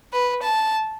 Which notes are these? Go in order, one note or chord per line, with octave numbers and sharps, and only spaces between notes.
B4
A5